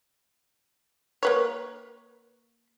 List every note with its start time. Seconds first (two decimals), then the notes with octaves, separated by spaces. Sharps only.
1.23 A#3 B4 C#5